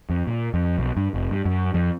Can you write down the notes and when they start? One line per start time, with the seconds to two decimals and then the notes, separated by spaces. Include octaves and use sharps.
0.10 F2
0.27 A#2
0.54 F2
0.78 B1
0.97 G2
1.14 F1
1.31 G2
1.45 F#2
1.74 F2